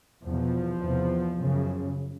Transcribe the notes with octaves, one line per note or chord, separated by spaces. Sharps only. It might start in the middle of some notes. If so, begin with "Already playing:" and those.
E2 B2 F3
E2 C3
F#2 C#3